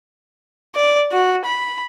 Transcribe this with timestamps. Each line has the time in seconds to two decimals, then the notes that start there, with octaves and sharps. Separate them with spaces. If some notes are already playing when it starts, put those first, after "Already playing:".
0.75 D5
1.12 F#4
1.45 B5